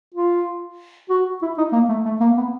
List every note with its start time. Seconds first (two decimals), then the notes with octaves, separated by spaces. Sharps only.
0.14 F4
1.09 F#4
1.42 E4
1.58 D#4
1.73 A#3
1.89 A3
2.05 A3
2.20 A#3
2.37 B3